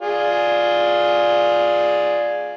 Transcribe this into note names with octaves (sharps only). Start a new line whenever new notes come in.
F4 G#4 D5